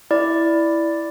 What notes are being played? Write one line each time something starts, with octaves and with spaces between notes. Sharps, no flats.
E4 D5